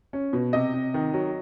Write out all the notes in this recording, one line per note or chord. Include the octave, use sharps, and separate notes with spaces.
C#4
B2
C3 D#5
C3
D#3
F#3